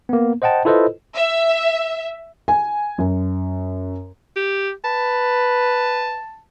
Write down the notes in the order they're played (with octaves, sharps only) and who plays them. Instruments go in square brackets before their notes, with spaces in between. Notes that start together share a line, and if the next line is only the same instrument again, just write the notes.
[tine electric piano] A#3 B3
C5 D#5 F#5 G5 A5
E4 F4 A4 B4 C5 D#5
[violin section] E5
[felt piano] G#5
F#2
[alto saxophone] G4
[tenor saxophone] B4 [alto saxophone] A5